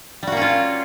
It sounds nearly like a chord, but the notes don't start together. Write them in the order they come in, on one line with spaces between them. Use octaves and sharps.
G3 F#4 A#3 C#4 F4